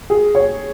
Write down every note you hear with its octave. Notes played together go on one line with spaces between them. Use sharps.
G#4
C#5